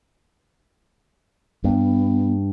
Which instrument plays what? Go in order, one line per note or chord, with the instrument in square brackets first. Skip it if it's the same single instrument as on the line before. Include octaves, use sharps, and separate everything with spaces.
[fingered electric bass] G2 [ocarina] B3